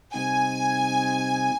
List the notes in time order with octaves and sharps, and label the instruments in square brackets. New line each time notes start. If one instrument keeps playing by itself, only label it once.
[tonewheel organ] C3 G3 C4 D#4 [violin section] G#5